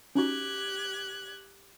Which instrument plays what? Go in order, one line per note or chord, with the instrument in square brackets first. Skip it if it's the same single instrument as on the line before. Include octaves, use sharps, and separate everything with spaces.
[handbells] C#4 D#4 F#4 [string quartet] G4 F#6 G#6